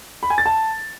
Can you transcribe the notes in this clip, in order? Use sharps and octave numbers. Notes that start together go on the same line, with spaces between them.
B5
G#5
A6
A5